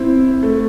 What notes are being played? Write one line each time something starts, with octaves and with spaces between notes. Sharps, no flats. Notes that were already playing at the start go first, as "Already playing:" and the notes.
Already playing: C4 E4
A3